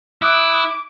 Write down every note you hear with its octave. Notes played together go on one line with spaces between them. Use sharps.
E4 D6 D#6 F#6